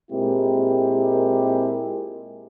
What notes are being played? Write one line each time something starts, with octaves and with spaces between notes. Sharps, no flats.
A#2 G#3 C4 E4 G4 A#4